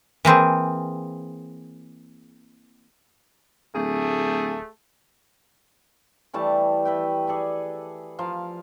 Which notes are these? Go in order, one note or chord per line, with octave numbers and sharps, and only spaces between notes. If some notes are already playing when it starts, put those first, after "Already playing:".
E3 A#3 C4 G#4
D1 A3 G#4
E3 G3 A3 A5
B4 E5 G5
G#4 A4 D5 G#5
F3 F5 A#5